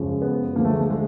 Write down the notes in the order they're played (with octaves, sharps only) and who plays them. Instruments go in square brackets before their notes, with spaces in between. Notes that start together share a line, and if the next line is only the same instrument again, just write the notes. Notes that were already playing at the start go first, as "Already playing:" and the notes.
Already playing: [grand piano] F#2 C#3 F3 G#3
B3
D2 D3 F3 G#3 A#3
A3
G#3
A3
G#3